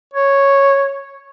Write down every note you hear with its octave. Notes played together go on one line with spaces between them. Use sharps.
C#5